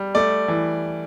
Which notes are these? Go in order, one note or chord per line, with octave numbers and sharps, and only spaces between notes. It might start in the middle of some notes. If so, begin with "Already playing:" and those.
Already playing: G3
A3 D5
E3